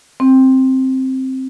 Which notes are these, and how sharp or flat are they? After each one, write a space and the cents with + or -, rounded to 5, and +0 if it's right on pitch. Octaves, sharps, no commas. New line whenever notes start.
C4 +5